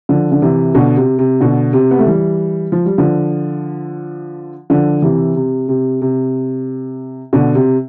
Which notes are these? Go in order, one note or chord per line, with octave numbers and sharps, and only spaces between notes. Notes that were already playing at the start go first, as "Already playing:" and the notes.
D3 F3
D3
C3 E3
B2 D3
C3
C3
B2 D3
C3
B3
A3
E3 G3
F3
G3
D3 F3
D3 F3
C3 E3
C3
C3
C3
B2 D3
C3